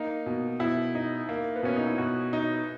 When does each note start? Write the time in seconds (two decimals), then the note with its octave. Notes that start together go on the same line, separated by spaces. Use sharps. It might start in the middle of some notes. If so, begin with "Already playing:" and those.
Already playing: A#3 D#4
0.26 B2
0.59 B2 E4
0.95 D#4
1.29 A#3
1.56 B3
1.63 B2 C#4
1.76 D#4
1.87 E4
1.98 B2 F#4
2.33 D#4